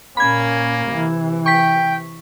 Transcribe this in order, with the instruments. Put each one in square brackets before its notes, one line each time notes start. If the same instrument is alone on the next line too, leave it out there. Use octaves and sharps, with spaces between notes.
[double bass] A#2 C#4 [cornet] A#3 [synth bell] B5 G#6
[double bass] C3 E3
[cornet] G5 [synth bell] C#6 B6